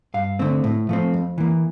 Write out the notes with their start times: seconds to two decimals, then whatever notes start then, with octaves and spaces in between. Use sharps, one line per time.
0.14 G2 F5
0.39 D3 A3 C4
0.64 A2
0.89 F3 A3 C4
1.14 F2
1.38 E3 A#3